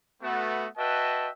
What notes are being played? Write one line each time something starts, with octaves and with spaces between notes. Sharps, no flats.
A3 B3 F#4
F#4 B4 D#5 E5 G5 A5